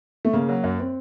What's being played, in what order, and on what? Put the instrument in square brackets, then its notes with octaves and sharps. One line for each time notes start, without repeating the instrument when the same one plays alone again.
[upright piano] A3
[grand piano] C#3 [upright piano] A#3
[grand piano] F#3
F#2
[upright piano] C4